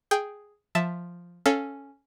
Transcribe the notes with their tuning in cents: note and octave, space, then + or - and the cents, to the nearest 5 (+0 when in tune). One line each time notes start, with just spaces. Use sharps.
G#4 +0 G5 +0
F3 +0 E5 +0 A5 +0
C#4 +0 A4 +0 F5 +0